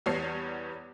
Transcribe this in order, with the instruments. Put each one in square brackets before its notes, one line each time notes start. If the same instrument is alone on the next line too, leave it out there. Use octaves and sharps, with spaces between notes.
[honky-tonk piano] E2 G3 B3 C#5 A5 C7